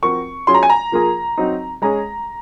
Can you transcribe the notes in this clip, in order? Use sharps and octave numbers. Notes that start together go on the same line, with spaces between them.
F3 C4 F#4 A#4 C#6
F#3 C#4 F4 G#4 C6
A#5
G#5
A#5
F3 A#3 F4 G#4
F#3 C4 D#4
G#3 C#4 G#4 A#5